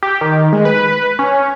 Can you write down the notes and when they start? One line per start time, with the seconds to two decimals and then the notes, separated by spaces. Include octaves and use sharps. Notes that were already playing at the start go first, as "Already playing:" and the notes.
0.03 G4
0.21 D#3
0.53 G#3
0.65 B4
1.19 C#4